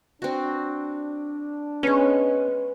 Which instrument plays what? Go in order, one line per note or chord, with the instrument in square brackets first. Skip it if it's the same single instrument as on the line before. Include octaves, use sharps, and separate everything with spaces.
[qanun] C4 F#4 [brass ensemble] D4
[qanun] G#3 B3 [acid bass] C#4